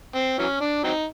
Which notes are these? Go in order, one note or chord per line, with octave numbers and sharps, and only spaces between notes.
C4
E3 F#3 C#4
D4
F#3 C4 D#4